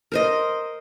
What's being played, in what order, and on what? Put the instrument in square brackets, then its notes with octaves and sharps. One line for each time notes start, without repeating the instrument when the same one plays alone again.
[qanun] A#4 C5 D#5